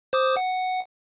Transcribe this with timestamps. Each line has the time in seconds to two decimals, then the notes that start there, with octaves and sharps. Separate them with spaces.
0.13 C5 D6 D#6
0.37 F#5